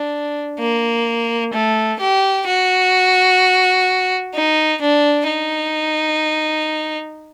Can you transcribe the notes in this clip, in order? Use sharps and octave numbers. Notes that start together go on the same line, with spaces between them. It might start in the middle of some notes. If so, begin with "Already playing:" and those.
Already playing: D4
A#3
A3
G4
F#4
D#4
D4
D#4